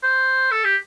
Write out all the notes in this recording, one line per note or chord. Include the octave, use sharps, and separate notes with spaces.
C5
A4
G4